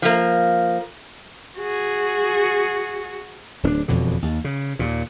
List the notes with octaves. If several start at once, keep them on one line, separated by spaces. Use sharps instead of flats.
F3 A#3
F#4 G#4
D1 C#4 D4
E1 F2 B2 D3
D#2
C#3
D#2 A#2